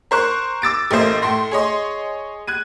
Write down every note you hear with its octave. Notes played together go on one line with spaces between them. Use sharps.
A#4 C5 C#6 F#6
D6 E6 A6 D7
A1 A3 A#3 C5 D#5
A2 A3 C6 A#6
G#4 C#5 D#5 C6
F#6 G#6 D#7